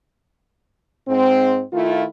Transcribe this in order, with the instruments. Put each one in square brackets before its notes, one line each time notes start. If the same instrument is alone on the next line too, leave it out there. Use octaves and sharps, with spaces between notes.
[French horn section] G#2 C4
D#3 A3 E4 F4